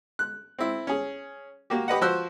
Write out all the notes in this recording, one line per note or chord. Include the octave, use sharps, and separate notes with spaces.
F#6
C4 E4
C#4 G#4
A#3 F#4 G4
G4 B4 D#5 F#5
F3 F#4 C5 E6 F#6